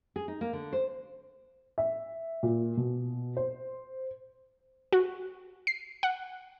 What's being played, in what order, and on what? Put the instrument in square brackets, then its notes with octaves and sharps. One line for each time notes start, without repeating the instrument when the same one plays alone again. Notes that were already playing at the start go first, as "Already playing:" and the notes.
[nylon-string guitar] G#4
D#4
A#3
D3
C5
[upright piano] E5
A#2
B2
C5
[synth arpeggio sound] F#4
C7
F#5